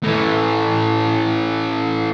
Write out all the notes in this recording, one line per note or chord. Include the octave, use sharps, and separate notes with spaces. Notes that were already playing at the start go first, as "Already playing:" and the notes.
A2 E3